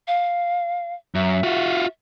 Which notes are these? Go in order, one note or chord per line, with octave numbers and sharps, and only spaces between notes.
F5
F#2 E5
F4 F#4